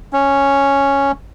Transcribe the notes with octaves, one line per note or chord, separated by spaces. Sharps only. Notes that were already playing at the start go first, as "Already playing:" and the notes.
C#4